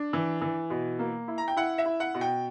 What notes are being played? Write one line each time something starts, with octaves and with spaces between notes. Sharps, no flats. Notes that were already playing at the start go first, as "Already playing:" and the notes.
Already playing: D4
E3
E3
B2
A#3
E4
A#5
G5
E4 F#5
E5
E4
F#5
B2
G5